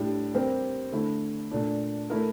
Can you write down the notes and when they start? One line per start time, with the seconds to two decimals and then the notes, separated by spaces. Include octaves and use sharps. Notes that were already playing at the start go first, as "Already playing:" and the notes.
Already playing: A2 G3 D4 G4
0.35 G3 C4 G4 A#4
0.92 D3 A3 E4
1.51 A#2 A3 D4
2.10 A3 E4 A#4